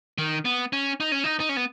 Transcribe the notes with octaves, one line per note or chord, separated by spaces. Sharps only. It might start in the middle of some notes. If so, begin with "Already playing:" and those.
D#3
B3
C#4
D#4
C#4
D#4
D#4
C#4
B3